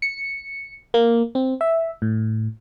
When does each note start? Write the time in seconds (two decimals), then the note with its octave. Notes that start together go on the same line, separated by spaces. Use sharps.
0.02 C#7
0.94 A#3
1.35 C4
1.61 E5
2.02 A2